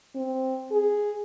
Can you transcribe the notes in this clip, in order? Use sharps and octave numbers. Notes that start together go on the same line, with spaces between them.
C4
G#4